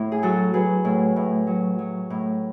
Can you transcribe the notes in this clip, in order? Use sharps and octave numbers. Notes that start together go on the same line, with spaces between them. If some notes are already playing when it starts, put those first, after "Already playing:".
Already playing: A2 E4
G#4
F#3 F#4 A4
F#3 G#4 B4
A2
A2
F#3
F#3
A2